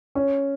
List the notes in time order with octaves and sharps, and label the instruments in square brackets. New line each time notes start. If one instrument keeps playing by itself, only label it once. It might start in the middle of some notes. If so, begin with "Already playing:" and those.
[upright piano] C#4